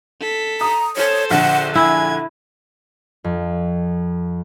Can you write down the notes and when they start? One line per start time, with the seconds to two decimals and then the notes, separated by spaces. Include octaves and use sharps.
0.20 A4 B6
0.61 A#5 D#6
0.97 A4 C5 C#5
1.31 A#1 D3 F#5
1.75 E4 G#5 G#6
3.24 F2